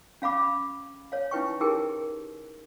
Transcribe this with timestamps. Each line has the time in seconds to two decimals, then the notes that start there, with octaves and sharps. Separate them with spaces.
0.22 C#4 F5 B5 D6
0.43 B5
1.12 C#5 F5
1.31 C#4 D#4 E4 B4 G5 C#6
1.60 D#4 E4 G4 G#4 A#4 G5